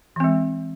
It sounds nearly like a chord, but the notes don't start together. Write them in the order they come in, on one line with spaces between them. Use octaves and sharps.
E3 C4 G#3